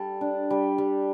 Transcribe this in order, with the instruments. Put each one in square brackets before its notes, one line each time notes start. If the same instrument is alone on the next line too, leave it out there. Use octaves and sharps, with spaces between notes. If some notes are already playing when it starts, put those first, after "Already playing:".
Already playing: [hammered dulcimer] G3 A4
D4
G3
G3